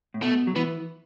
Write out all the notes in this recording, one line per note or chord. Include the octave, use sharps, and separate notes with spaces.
A2
B2 A3
F#3
E3 B3